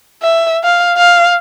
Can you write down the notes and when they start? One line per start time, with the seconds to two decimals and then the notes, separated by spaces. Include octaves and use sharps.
0.22 E5
0.64 F5
0.97 F5